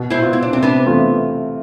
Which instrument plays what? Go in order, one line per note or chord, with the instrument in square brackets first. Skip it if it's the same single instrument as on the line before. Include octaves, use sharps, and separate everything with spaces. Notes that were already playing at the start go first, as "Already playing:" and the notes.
Already playing: [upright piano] B2
[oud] C4 E4
[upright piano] B3 F4
[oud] E4
D4
[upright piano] C3 [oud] C4
[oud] B3 D4
[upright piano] E3 A3 C4 F4